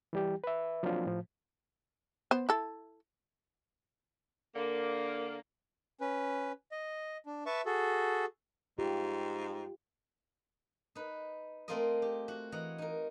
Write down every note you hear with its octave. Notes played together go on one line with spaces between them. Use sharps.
E3 G3 G4
B4 E5
F3 F#3 A#3 C4 D4 F4
A2 F3
B3 C5
E4 A4
D3 A#3
C#4 B4
D#5
D4
B4 E5 A5 C#6
F#4 G#4 A4
G#2 F4 G4
D#4 B4
A3 A#3 C4 F4 A#4 D#5
G4
F#4
E3 D#5 F#5 A#5
D#4 A#4